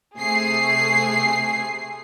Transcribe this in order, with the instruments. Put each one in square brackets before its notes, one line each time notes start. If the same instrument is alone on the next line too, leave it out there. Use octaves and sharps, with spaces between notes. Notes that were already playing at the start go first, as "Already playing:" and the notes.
[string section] C3 A3 G#4 C7